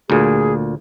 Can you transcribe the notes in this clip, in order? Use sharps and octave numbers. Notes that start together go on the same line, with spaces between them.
D2 A#2 G#4